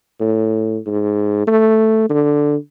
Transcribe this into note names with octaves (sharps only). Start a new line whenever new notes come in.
A2
G#2
A3
D3